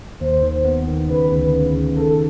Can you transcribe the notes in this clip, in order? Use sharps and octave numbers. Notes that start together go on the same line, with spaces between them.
D#2 C5
D#3
B3
D#3
C#3 B4
D2
C#3
C#3
D#3 A4